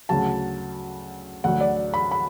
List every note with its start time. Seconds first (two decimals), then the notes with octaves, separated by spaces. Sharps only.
0.09 D2 C#3 F#3 A5
1.44 D2 D3 F#3 F#5
1.61 D5
1.94 B5
2.11 B5